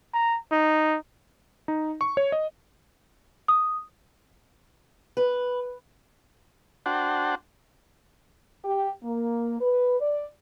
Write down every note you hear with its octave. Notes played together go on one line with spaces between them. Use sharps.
A#5
D#4
D#4
C#6
C#5
D#5
D#6
B4
D4 F#4 C5 F#5 G5 A5
G4
A#3
B4
D5